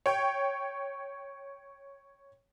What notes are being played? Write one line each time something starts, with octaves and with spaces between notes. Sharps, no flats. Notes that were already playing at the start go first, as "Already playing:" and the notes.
C#5 G5